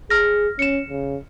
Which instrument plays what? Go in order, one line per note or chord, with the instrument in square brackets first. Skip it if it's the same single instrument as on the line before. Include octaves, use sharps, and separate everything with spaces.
[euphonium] G#4 [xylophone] F6 A#6
[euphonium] C#4 [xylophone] C#7 E7
[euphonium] C#3